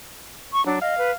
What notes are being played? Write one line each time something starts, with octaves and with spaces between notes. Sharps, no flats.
C#6
F#3 D4
D#5 F5
B4